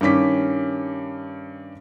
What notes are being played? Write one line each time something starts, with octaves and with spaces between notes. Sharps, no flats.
G2 D#3 C#4 D6 B6